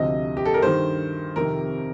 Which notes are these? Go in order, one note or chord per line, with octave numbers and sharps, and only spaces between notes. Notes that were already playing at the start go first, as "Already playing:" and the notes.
Already playing: D2 C3 F3 D#5
G4
A4
A#4
G2 D#3 C5
F2 C3 D#3 A#4